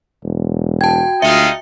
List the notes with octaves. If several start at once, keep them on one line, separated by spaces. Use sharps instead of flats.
E1
F#4 G5 A5 G#6
D2 G#3 D#4 F4 E5 C#7